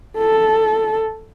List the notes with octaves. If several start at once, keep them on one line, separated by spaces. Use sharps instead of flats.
A4